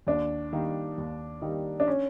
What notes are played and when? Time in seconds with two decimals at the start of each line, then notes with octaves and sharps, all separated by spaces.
0.07 D#2 D4
0.53 D#3 G3 A#3 D#4
0.98 D#2
1.42 D#3 G3 A#3 D#4
1.80 D4
1.88 C#4